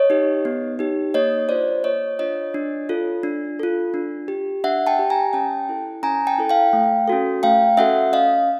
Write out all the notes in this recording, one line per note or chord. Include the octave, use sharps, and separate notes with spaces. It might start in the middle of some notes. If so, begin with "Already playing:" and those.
Already playing: C#5 D#5
D#4 G4
B3
D#4 G4
A#3 C#5 D#5
D4 F4 C5 D5
A#3 C#5 D#5
D4 F4 C#5 D#5
D4
F4 A4
D4
F4 A4
D4
G4
D4 E5 F#5
G5 A5
G4
G#5 A#5
C#4 G5 A5
E4 A4
C#4 G#5 A#5
G5 A5
E4 A4
F5 G5
A3
C#4 F#4 A4
A3 F5 G5
C#4 F#4 A4 E5 F#5
C#4 D#5 F5